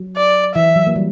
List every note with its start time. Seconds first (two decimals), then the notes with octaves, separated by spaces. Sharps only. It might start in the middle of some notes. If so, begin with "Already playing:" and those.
Already playing: F#3
0.16 D5
0.55 E3 E5
0.76 F#3
0.87 A#3
0.96 G3